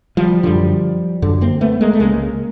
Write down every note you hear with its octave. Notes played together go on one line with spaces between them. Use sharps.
F3 G3
F#2 D3 F3 G3
F#2 D3
A#3 C4
A3 B3
G#3 A#3
A3
C#2 C#3 G#3 A#3